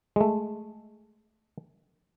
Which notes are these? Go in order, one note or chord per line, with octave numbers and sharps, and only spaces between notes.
G#3 A3